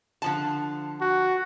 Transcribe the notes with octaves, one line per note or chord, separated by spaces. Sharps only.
D3 F3 A5
F#4